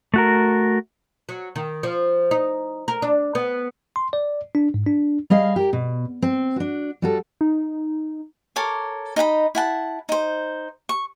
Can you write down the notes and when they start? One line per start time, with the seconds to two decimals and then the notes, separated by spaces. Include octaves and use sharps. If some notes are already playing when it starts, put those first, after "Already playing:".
0.14 A3 F#4 A#4
1.29 F#3
1.56 D#3
1.83 F3
2.31 D#4
2.88 A#4
3.02 D4
3.35 B3
3.96 C6
4.13 D5
4.55 D4
4.74 G#2
4.86 D4
5.30 G3 G#4 D#5 F5
5.56 G4 A#4
5.73 B2
6.22 C4
6.56 D4 F#4
7.02 G3 F#4 A4
7.41 D#4
8.56 A4 A#4 C#5 D6
9.16 D#4 D#5 G5 B5
9.55 E4 F#5 A5
10.09 D#4 C5
10.89 C#6